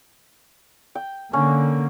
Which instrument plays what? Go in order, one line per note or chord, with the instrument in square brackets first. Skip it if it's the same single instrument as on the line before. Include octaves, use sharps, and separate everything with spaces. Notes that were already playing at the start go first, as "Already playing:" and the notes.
[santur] G5
[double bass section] D3 A#3 [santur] C#4